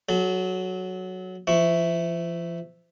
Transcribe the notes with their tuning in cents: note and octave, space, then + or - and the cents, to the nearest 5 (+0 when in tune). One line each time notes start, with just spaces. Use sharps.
F#3 +0 A4 -35
F3 -35 E4 +0 C#6 +0